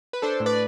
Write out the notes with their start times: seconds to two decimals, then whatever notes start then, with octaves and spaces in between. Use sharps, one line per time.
0.13 B4
0.22 D4 A4 C5
0.40 A2
0.46 B4 D5